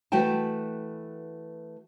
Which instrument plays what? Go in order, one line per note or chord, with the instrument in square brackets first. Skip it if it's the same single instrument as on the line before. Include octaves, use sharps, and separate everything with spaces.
[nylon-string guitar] E3 A3 F#4 B4 G5 A5